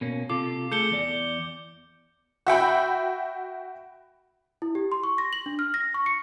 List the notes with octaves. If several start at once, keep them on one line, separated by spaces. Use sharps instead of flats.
B2 A#3 C#4
C3 F4 A4 D6
A3 G#4 A4 G6 C#7 G7
E2 D5
F#4 E5 G5 B5
E4
G4
C6
C#6
A#6
F#7
D4
F6
A#6
C#6
C#7